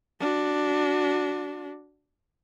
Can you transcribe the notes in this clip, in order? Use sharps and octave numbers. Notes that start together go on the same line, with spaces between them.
D4 F#4